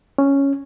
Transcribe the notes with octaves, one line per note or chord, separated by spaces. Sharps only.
C#4